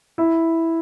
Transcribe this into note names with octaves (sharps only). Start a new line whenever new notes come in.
E4